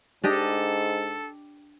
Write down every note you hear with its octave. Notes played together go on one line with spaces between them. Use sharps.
G#2 D4 G4 A4 D#5